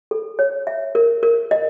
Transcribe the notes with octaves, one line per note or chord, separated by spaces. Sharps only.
A4
C#5
E5
A#4
A#4
D#5